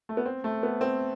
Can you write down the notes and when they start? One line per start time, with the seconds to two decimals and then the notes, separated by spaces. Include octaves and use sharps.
0.09 A3
0.17 B3
0.26 C4
0.44 A3
0.63 B3
0.81 C4